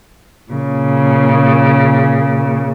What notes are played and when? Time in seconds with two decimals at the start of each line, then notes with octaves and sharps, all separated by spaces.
0.51 A#2 C#3